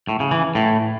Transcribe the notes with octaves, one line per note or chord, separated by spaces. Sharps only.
A2
C#3
E3
A2